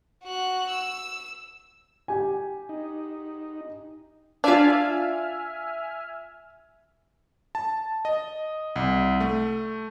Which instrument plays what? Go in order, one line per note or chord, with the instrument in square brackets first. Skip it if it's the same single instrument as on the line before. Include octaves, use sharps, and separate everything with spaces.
[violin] F#4 F#6
E6
[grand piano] G4 G#5
[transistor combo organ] D#4
[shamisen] D4 [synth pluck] F4 D5 F5 [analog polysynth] E5 G#5 F6
[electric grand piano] A5
D#5
C2
A3